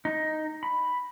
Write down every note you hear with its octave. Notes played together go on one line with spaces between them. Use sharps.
D#4
B5